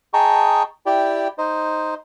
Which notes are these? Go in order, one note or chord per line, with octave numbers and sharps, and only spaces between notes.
G#4 D#5 G5 A5 A#5 C#6
E4 G4 D5 G5
D#4 C5 D#5